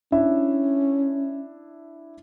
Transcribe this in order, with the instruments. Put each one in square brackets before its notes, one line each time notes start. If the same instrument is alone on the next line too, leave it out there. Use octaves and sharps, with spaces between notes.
[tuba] C#4 [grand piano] D4 E4 E5